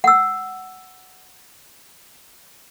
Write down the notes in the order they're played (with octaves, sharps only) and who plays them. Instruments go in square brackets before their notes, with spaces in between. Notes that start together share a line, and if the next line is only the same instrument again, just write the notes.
[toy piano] F#5 E6